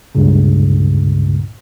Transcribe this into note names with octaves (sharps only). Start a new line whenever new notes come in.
C#2 G2 A#2 C#3